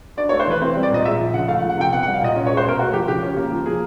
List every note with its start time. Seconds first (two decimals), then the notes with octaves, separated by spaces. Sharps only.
0.17 D4 D5
0.29 C#5
0.32 A3
0.40 C5
0.47 E3 B4
0.62 C4 C5
0.76 G3
0.83 D5
0.91 A#2 D#5
1.05 G#3 E5
1.20 F3
1.34 C#3 F#5
1.48 A3 F5
1.59 F#5
1.62 F3
1.70 F#5
1.77 C3 G5
1.92 B3 F#5
2.03 F#5
2.06 G3
2.14 F5
2.21 A#2 D#5
2.36 C#4
2.47 C#5
2.50 G#3
2.57 C5
2.65 B2 A#4
2.79 A3 F#4
2.93 F3 G4
3.08 C#3 G4
3.23 C#4
3.37 A#3
3.52 F3
3.66 A#3 G#4